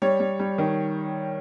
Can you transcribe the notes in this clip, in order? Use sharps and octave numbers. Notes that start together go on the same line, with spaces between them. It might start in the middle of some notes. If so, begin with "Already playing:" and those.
G3 C#5
G3
G3
D#3